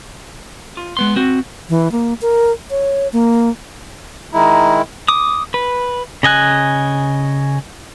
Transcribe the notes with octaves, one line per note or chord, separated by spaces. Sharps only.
F4
G#3 B3 C6
C4 F#4
E3
A#3
A#4
C#5
A#3
D#3 G#3 E4 A#5
D6 D#6
B4
C#3 D#5 G#5 F#6